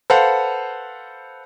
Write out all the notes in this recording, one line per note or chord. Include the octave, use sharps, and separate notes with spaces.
A4 B4 C5 F5 F#5